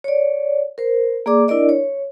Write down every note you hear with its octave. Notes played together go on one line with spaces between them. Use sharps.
C#5 D5
A#4 C5
A#3 G#4 D5 D6
D4 E4 A#4 D5 D#5
C#5